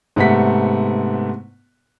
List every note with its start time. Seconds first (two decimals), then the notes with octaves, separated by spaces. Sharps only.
0.16 G#2 C3 A3 B3 F#5 B6